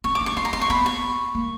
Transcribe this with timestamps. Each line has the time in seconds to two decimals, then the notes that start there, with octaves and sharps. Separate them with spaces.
0.04 C4 C#6
0.15 D6
0.21 C#4
0.26 C#6
0.37 C4 C6
0.45 A#5
0.53 C4 C6
0.61 C#6
0.70 B3 B5
0.86 C#6
1.35 A#3